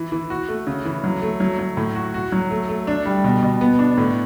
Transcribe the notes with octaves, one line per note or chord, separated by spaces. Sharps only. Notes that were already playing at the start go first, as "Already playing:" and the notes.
Already playing: E3
E3
F#4
A3
C#3
E3
F#3
A3
F#3
F#3
A2
F#4
F#4
F#3
A3
A3
D4
G3
B2
B2
B3
D4
A2